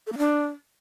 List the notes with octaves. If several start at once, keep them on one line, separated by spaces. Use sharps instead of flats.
A4
A#3
D4